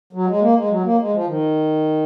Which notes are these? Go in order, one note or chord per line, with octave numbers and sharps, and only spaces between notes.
F#3
G#3
A#3
G#3
F#3
A#3
G#3
F3
D#3